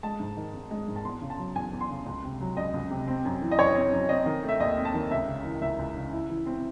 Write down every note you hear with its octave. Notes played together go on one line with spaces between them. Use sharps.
G#3 A5
G#2
D#3
G#1
G#3
G#2
A5
E2 C6
C#3
A5
F#3
E2 G#5
E2
C6
C#3
C#2
C3
F#3
C#2 D#5
C#2
C3
C4
F#2
E3
D#5
F#1 C#5
C4
F#2
C4 D#5
D#3
A3
E5
D#2 D#5
C4
A5
D#3
C#2 E5
C#3
E3
C#2 E5
C#2
C#3
E4
E3
C4